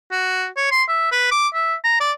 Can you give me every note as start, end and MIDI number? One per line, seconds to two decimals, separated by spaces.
0.11 0.47 66
0.57 0.69 73
0.71 0.83 84
0.88 1.10 76
1.12 1.29 71
1.31 1.48 86
1.54 1.74 76
1.84 2.00 82
2.00 2.11 74